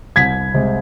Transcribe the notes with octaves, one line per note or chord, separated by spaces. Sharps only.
C2 G#6 B6
C3 G#3